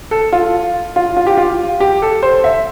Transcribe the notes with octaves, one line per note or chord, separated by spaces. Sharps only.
A4
F4
F4
F4
G4
F4
G4
A4
C5
E5